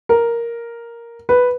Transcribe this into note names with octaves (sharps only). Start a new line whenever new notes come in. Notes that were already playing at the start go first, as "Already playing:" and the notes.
A#4
B4